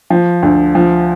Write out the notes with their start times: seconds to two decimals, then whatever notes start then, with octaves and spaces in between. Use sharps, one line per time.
0.10 F3
0.42 D2
0.75 F3